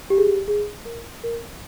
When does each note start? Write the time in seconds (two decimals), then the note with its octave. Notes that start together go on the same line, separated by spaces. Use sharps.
0.10 G4
0.18 G#4
0.27 G4
0.48 G#4
0.85 A#4
1.24 A#4